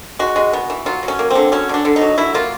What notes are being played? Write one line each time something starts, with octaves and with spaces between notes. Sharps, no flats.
G#3 F#4
G#3
B3
E3
F#3 F4
F#3
C#4
A#3
D3 C4
F#3 C#4
D3 D4
D3
D#4
F#3
F#3 E4
A#3 F4